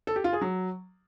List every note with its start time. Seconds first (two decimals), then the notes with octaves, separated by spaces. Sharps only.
0.07 A4
0.16 G4
0.24 F4
0.33 G#4
0.41 F#3